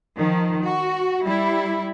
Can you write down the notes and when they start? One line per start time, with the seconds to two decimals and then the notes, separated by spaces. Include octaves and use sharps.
0.17 D#3 F3
0.63 F#4
1.21 G3 E4